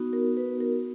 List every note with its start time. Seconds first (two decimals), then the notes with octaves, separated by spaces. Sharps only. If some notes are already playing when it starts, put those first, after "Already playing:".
Already playing: B3 D#4 F#4
0.13 A#4
0.37 B4
0.60 A#4